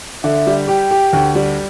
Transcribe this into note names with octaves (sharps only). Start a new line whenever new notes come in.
D3 E5
G3
G4 G5
G4
D2
G3